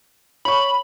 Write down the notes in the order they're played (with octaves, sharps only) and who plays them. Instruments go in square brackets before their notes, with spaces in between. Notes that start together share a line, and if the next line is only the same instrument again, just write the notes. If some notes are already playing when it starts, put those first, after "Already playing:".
[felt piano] C#5 C#6 [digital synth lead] B5